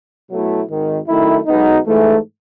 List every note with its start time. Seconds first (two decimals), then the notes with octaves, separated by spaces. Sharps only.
0.30 B2 F#3 A3 E4
0.69 G#1 G#2 D#3
1.08 F#2 D#3 A3 E4
1.47 B1 B2 G#3 B3 D#4
1.86 G#2 E3 A3